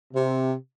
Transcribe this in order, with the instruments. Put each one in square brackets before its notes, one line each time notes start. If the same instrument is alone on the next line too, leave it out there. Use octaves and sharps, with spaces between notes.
[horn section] C3